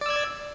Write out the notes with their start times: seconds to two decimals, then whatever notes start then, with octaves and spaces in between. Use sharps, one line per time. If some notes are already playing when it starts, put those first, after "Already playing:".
0.01 D5
0.06 E6
0.10 G#6